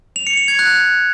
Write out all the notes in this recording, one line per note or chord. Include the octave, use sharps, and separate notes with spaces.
F7
C#7
F7
G#6
F#6